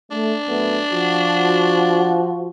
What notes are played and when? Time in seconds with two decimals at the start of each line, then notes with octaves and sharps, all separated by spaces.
0.11 A3 D4
0.47 F#2 A3 B3
0.92 F3 F#4